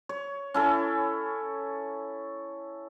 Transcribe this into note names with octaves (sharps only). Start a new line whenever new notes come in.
C#5
C#4 E4 A4